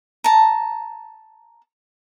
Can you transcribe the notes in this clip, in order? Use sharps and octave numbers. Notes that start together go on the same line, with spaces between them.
A5 A#5